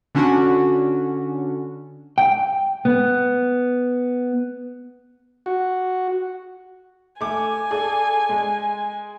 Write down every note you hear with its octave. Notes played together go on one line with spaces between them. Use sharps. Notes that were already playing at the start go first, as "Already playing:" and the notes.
D3 C#4 D4 F#4
G5
B3
F#4
A3 G#5 D6
G#4 A4 D5
G#3